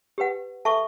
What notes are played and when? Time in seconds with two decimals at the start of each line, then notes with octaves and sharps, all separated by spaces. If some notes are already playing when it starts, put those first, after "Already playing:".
0.18 G4 B4 F#5
0.65 A4 E5 A5 C#6